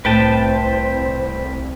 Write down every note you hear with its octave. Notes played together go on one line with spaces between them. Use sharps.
C2 A2 B4 C5 G5 A5